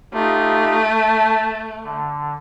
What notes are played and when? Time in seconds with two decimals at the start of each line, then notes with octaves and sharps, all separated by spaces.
0.13 A3 D#4 F4 G4
0.96 A5
1.83 D3